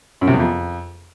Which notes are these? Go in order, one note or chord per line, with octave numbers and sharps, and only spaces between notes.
F#2
C3
E2
F2